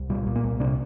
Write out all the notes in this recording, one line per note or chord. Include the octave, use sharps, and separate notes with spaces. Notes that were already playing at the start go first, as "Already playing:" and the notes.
Already playing: C2
A#2 G3
A#2
A#3
C2
C3 D4